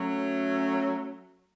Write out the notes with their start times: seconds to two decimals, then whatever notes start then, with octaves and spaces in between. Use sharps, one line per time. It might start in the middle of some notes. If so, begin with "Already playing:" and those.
Already playing: F#3 A3 C#4